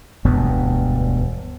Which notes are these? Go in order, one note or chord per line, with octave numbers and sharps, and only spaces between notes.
E1 D2 G2 B3